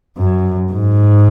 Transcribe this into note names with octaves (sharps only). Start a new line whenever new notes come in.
F#2
G#2